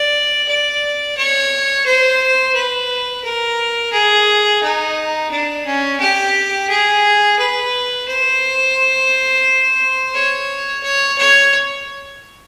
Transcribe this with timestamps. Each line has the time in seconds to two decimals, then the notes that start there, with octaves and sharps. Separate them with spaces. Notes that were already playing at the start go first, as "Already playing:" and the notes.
Already playing: D5
0.48 D5
1.17 C#5
1.86 C5
2.55 B4
3.24 A#4
3.93 G#4
4.63 D#4
5.31 D4
5.66 C#4
6.00 G4
6.69 G#4
7.39 B4
8.08 C5
10.14 C#5
10.83 C#5
11.18 C#5